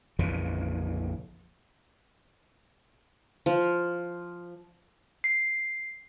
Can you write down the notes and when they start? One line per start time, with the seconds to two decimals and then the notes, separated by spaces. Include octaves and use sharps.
0.19 A#1 F2 C#3 E3
3.46 F3
5.24 C7